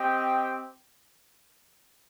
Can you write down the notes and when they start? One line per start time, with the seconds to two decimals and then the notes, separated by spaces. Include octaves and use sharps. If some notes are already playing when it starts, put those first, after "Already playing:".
Already playing: C4 G4 D#5 G5